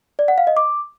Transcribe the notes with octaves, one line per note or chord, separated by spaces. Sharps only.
D5
F#5
F5
D#5
D6